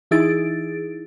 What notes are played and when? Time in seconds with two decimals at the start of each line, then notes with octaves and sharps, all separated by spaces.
0.11 E3 D#4 E4 G#4 A6 D7